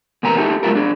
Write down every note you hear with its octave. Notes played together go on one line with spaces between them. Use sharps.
E2 C3 B3 A#4 G#5 A#5
D#4 E4 G4 A4
F#3 G#3 E4 F4 A#4
D4 G#4